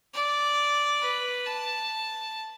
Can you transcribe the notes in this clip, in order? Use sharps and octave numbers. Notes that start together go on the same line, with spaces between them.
D5
B4
A5